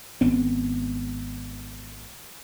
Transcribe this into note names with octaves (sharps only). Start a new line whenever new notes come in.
G#1 B3 C4